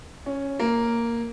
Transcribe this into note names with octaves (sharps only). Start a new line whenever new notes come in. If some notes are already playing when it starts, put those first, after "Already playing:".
C#4
A#3